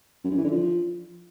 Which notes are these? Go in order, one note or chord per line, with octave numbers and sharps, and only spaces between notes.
F#2
G2
E3
D3
F3